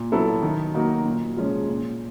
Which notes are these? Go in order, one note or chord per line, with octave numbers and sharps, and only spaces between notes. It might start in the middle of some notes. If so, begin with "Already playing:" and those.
Already playing: A#2
F#3 B3 E4 A4
D#3
F#3 A#3 D#4 F#4
A#2
F3 G#3 C#4
A#2